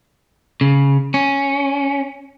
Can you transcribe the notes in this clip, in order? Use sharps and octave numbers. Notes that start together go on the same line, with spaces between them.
C#3
C#4